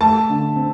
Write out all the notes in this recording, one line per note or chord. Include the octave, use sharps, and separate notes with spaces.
A3 A5
D3
C4